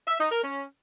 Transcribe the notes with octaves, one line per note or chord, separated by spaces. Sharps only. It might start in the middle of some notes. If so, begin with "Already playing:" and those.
E5
D#4
A#4
C#4